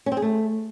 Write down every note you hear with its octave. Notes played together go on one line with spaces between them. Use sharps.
C#4
C4
G#4
A3